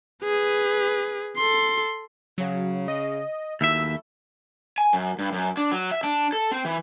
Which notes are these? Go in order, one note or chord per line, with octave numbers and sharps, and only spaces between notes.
G#4 B4
A4 C6
C#3 F#3
D#5
D#2 F#3 A3 E4 E5 E6
G#5
F#2
G2
F#2
D4
F#3
E5
D4
A4
C4
E3